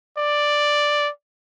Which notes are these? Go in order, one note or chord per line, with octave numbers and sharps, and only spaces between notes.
D5